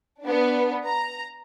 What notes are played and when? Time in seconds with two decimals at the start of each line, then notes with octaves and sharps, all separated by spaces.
0.22 B3 D4
0.86 A#5